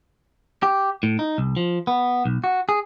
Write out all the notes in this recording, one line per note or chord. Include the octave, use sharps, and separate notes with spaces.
G4
A2
D#4
C2
F3
B3
B1
F#4
G#4